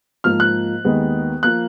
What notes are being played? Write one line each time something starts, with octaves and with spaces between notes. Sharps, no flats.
G#2 F3 A#3 F6
F#6
D#2 D#3 G#3 B3
F3 A#3 F#6